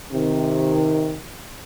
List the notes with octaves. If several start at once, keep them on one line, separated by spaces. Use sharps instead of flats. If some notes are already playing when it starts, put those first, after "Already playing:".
C3 D#3